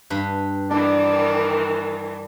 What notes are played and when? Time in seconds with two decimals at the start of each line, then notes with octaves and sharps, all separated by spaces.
0.10 G2 B4
0.71 D#3 E3 D4 D5